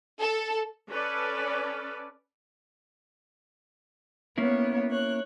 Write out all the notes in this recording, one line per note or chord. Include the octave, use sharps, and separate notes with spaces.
A4
C#4 A4 B4 D5
A#3 B3 C#4 E4 C#5
C#5 F#6